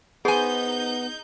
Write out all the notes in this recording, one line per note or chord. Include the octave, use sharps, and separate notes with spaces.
B3 D#4 G#4 C5 G#5 G6